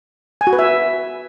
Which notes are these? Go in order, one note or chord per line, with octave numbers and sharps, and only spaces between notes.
G#5
F#4
B4
E5